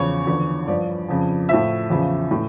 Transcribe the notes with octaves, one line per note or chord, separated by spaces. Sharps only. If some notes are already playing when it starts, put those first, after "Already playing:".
Already playing: E2 C#3 F3 C#5
E2 D3 F3
G2 F3 D5
F2 C#3 F3
A2 F3 E5
E2 C#3 F3
A2 E3